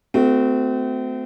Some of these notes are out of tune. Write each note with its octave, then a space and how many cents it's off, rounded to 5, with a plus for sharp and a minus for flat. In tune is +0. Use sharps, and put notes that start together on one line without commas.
A3 +0 C4 -35 F#4 -15